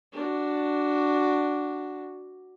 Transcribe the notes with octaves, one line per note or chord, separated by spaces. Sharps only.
D4 F#4